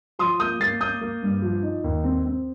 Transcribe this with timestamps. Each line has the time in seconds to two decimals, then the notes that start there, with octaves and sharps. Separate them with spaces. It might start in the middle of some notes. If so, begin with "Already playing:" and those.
0.19 F3 C6 D#6
0.40 A#3 D#6 G6
0.60 A#3 A6 C7
0.81 A#3 D#6 G6
1.01 A#3
1.22 G2
1.42 F3
1.63 D#4
1.84 D#2
2.04 C4
2.26 C4